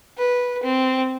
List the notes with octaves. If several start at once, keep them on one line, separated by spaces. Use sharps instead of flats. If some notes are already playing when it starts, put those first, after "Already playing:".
B4
C4